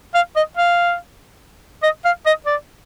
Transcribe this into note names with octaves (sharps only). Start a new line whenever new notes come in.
F5
D#5
F5
D#5
F5
D#5
D5